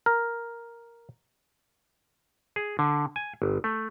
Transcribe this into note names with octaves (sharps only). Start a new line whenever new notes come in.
A#4
G#4
D3
G#5
G1
A3